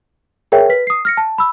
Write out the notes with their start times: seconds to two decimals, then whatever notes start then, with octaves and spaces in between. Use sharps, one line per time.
0.52 G#4 A#4 C#5 E5 G5
0.69 B4 B6
0.87 D#6 C7
1.05 F6 A#6 C#7
1.17 A5
1.38 B5 E6